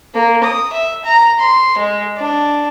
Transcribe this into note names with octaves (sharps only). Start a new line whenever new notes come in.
A#3
D#6
E5
A#5
C6
G#3
D4